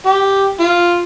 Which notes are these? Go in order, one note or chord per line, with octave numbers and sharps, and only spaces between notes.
G4
F4